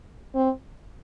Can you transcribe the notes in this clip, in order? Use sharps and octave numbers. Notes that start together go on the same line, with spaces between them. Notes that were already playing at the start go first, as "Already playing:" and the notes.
C4